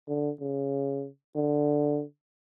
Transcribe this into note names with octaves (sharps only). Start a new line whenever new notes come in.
D3
C#3
D3